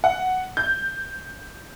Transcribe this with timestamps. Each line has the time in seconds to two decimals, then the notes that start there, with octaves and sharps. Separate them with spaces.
0.04 F#5
0.57 G6